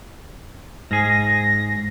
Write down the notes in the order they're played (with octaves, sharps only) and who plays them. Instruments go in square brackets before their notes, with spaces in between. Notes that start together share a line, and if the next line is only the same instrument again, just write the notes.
[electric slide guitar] G#2 G#4 [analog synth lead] A#6